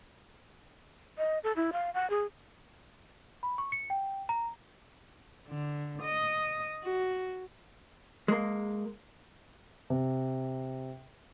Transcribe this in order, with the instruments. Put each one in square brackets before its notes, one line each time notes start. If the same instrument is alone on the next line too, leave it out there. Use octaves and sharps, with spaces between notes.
[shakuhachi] D#5
A4
E4
F5
F#5
G#4
[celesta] B5
C#6
C#7
G5
A#5
[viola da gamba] D3
D#5
F#4
[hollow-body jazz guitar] G#3 A#3
[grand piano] C3